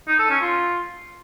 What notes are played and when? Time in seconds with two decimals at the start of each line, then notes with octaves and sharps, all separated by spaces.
0.08 D#4
0.19 A4
0.30 C#4
0.41 F4